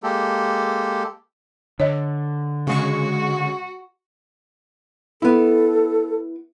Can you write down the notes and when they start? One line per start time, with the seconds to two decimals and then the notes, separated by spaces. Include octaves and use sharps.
0.03 G#3 A#3 G4 A4
1.80 D3 C#5 D#5
2.67 C#3 G#3 F#4 C#6
5.22 B3 E4 A4